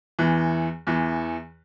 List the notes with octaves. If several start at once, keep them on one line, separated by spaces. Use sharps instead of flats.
E2 E3
E2 E3